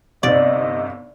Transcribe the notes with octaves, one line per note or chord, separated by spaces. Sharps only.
G1 C3 D#4 D5 D#5